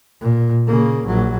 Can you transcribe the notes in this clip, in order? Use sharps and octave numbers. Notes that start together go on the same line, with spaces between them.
A#2
C#3 A#3
A#1 F#3